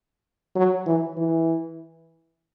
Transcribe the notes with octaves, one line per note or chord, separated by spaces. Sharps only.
F#3
E3
E3